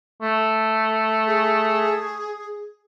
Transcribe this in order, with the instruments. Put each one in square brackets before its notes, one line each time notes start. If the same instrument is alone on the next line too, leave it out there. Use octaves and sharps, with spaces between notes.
[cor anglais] A3
[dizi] G#4